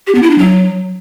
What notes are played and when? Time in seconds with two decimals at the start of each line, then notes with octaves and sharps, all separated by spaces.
0.07 G4
0.15 B3
0.23 E4
0.30 D4
0.38 F#3